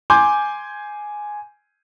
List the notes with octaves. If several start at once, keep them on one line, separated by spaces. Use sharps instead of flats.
G#5 C6 D6 G6